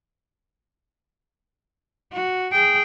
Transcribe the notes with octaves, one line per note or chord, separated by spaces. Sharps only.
F#4
G#4 G5